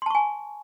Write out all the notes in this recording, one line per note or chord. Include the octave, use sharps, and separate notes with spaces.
G#5 A5 C6 C#6